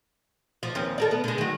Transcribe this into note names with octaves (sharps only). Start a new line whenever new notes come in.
F3
D#2 C4 C#4
A4 A#4 D5
B3
D3 G#3
D#3 F#3